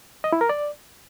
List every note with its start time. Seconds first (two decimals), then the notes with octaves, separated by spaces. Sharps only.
0.24 D#5
0.33 E4
0.41 A#4
0.49 D5